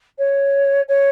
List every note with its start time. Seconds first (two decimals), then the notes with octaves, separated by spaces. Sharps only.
0.18 C#5
0.88 C#5